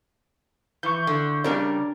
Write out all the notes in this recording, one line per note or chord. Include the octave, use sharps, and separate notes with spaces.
E3 C#6 G6
D3
C#3 G3 D4 A#4